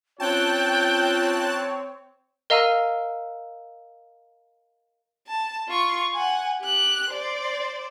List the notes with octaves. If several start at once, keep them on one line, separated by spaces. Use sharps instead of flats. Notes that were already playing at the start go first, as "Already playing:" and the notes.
C4 C#4 F4 C#5 G5 A5 F#6
A#4 D#5 F5 A#5 E6 D#7
A5
F4 C#6
F#5 G#5
G4 F#6
C5 D5